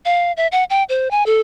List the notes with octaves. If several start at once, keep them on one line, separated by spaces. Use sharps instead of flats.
F5
E5
F#5
G5
C5
G#5
A4